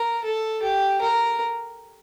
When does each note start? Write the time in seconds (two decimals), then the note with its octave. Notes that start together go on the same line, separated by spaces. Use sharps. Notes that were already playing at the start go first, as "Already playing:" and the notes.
Already playing: A#4
0.24 A4
0.62 G4
1.01 A#4